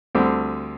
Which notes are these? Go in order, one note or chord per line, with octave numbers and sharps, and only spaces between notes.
D2 D3 G3 C4